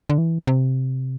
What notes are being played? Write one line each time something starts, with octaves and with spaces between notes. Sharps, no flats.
D3
E3
C3